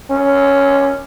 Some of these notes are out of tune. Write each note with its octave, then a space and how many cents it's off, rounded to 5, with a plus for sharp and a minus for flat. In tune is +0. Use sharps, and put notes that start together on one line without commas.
C#4 +5